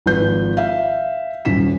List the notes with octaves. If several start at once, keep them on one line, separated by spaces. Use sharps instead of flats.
G#1 F3 B4 G6
E5 F5
D#1 F#2 B6 E7